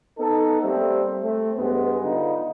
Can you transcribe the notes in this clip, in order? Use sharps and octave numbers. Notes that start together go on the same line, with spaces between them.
B3 D#4 A4
G3 A3 A#3 C4
A3 C4
G2 G#3 B3
D3 B3 D#4 F4